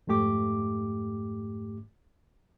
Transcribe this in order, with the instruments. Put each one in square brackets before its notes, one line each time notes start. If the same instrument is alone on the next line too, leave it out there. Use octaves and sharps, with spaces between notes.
[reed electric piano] F2 G#2 A3 G4 D6